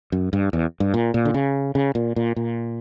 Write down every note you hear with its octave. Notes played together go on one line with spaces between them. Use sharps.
F#2
G2
E2
G2
A#2
A#2
D3
C#3
C#3
A#2
A#2
A#2